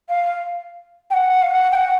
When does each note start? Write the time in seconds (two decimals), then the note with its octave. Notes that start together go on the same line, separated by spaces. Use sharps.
0.09 F5
1.10 G5
1.13 F#5
1.42 F5
1.51 F#5
1.71 G5
1.75 F#5